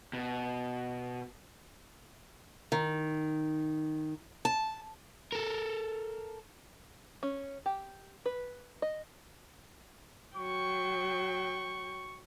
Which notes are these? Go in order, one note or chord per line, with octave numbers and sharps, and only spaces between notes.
B2
D#3
A5
A4 A#4
C#4
G4
B4
D#5
F#3 G5 C#6